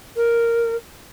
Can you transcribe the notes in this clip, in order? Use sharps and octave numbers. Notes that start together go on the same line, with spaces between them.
A#4